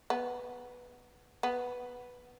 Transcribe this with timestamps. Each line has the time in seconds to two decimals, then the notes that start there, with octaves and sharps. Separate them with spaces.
0.10 B3
1.43 B3